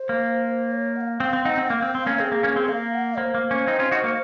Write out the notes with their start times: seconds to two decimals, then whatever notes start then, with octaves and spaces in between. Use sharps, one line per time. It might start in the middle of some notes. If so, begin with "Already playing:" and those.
Already playing: C5
0.09 A#3
0.71 C#5
0.96 F#5
1.01 F5
1.20 C4 F5
1.33 C4
1.45 C4 D#4 F#5
1.57 C4
1.70 A#3 F5
1.82 C4
1.95 C4
2.07 A#3 C#4
2.19 C4 G#4
2.32 A#3
2.43 A#3 C#4
2.56 C4
2.68 A#3 F5
2.94 F#5
3.18 A#3 C5
3.35 A#3
3.51 A#3 C#4
3.67 C4 D#4
3.79 C#4 F4
3.91 D#4 F#4
4.04 A#3